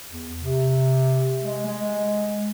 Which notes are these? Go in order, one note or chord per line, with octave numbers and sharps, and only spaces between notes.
E2
C3
G#3
G#3